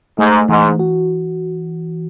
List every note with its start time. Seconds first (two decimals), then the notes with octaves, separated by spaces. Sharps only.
0.18 G#2 A3
0.49 G#2 E3
0.79 F#4